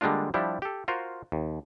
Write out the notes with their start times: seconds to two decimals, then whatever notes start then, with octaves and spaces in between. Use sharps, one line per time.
0.01 D3 G3 G#3 A#3 D4 F4
0.34 F3 G3 D4 E4 G4
0.62 G4 A4
0.88 F4 F#4 A#4 C5
1.32 D#2